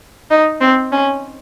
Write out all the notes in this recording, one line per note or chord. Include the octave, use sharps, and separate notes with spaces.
D#4
C4
C#4